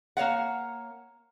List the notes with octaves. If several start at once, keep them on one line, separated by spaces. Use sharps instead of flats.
A#3 C#5 F5 F#5